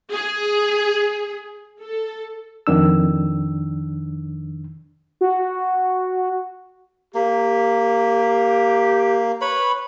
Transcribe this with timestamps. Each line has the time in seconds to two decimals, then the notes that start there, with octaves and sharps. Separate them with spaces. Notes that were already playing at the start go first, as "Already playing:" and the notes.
0.11 G#4
1.82 A4
2.67 F2 D#3 D4 E6
5.21 F#4
7.15 A#3 G4
9.41 B4 C#5 B5